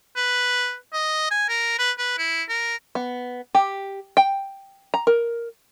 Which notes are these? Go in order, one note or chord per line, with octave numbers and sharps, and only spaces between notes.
B4
D#5
G#5
A#4
B4
B4
E4
A#4
B3
G4
G5
A#5
A#4